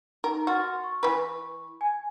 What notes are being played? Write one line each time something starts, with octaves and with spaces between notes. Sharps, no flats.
D#4 A#4
F#4 C6 F6 A6
C#6
E3 B4
G#5 G#6